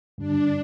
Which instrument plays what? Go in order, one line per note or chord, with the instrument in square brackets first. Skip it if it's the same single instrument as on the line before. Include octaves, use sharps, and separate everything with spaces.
[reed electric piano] G2 D3 G3 [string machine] D4